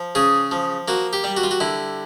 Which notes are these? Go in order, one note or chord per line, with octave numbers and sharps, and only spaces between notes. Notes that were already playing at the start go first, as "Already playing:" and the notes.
Already playing: F3
C#3 G#4
F3
A#3 F#4
G4
G3
F#4
F4
F#4
D3 E4